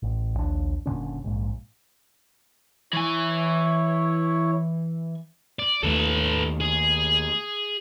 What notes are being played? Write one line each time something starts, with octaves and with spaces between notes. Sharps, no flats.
A1
A#1 D#2 D4
F#1 A#2 D3 C#4
A#1 G#2
E3 E4 C#5 G#5
D5
D#2 D#3 A3 A4 B4
G#4